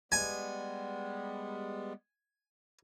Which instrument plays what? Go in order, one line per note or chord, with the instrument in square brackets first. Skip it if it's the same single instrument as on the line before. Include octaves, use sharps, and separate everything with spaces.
[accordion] G3 G#3 B3 [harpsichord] G#5